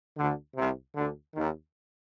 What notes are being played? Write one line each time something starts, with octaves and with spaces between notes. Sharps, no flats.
D2 D3
C2 C3
D2 D3
D#2 D#3